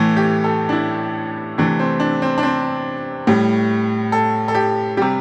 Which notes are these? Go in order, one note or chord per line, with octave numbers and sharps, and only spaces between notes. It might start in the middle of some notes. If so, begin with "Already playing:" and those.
Already playing: A2 E3 A3
G4
A4
D4
E4
C3 E3 A3 D4
C4
D4
C4
D4
C4
A2 G3
A4
A4
G4
C3 G3 G4